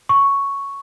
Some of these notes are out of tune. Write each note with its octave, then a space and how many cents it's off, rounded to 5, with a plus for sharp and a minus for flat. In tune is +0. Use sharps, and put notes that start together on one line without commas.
C#6 +0